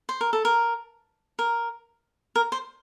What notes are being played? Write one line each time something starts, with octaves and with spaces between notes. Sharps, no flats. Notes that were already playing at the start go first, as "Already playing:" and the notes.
C5
A#4
A4
A#4
A#4
A#4
C5